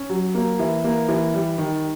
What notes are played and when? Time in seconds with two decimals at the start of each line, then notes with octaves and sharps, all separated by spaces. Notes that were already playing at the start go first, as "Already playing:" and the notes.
Already playing: C#4
0.10 F#3
0.35 A#3
0.59 E3
0.84 A#3
1.09 E3
1.34 G3
1.58 D#3